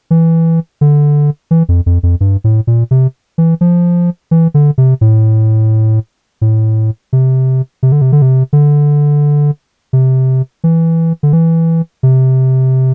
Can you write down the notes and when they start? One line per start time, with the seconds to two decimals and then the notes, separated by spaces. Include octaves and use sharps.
0.11 E3
0.81 D3
1.51 E3
1.69 F2
1.86 F2
2.03 F2
2.21 G2
2.44 A2
2.67 A#2
2.91 C3
3.38 E3
3.61 F3
4.31 E3
4.54 D3
4.78 C3
5.01 A2
6.41 A2
7.13 C3
7.83 C3
7.92 D3
8.02 C3
8.12 D3
8.22 C3
8.53 D3
9.93 C3
10.64 E3
11.23 D3
11.33 E3
12.03 C3